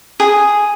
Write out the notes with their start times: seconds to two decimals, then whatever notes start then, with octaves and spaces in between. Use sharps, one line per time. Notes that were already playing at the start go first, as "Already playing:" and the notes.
0.20 G#4